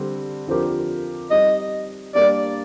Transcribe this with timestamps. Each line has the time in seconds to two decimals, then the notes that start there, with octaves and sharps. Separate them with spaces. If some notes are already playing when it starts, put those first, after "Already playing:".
Already playing: D3 G3 C4
0.47 D3 F3 C4 G4 A#4
1.31 G3 C4 D#4 D#5
2.15 G3 A#3 D4 G4 A#4 D5